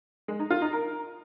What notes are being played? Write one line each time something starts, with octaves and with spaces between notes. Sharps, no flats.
G#3
D#4
F4
D#4
A#4